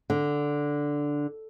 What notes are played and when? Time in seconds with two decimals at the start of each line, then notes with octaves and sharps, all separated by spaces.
0.10 D3